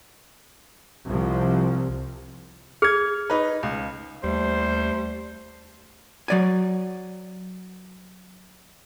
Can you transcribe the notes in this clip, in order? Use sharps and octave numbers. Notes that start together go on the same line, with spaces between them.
C2 C3 F3
G#4 F6 G#6
D#4 B4
C#2
D#2 G3 A3 C5
F#3 D5 G#5